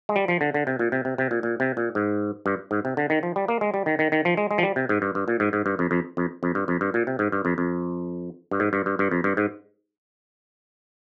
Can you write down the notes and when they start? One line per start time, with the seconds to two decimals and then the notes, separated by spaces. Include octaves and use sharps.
0.09 G#3
0.16 G3
0.28 F3
0.41 D3
0.54 D3
0.67 C3
0.79 A#2
0.92 C3
1.05 C3
1.18 C3
1.31 A#2
1.43 A#2
1.60 C3
1.77 A#2
1.95 G#2
2.46 G2
2.71 G#2
2.85 C3
2.97 D3
3.10 D#3
3.23 F3
3.36 G3
3.48 A#3
3.61 G#3
3.74 G3
3.86 D#3
3.99 D#3
4.12 D#3
4.25 F3
4.37 G#3
4.51 G#3
4.58 F3
4.63 G3
4.76 C3
4.89 G#2
5.02 G2
5.15 G2
5.28 A#2
5.40 G#2
5.53 G#2
5.66 G2
5.79 F2
5.91 F2
6.17 F2
6.43 F2
6.55 G2
6.68 F2
6.81 G2
6.94 A#2
7.07 C3
7.19 G#2
7.32 G2
7.45 F2
7.58 F2
8.51 G2
8.60 G#2
8.73 G2
8.86 G2
8.99 G2
9.11 F2
9.24 G2
9.37 G#2